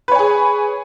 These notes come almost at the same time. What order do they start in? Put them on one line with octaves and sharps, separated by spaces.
B4 C#5 G#5 G#4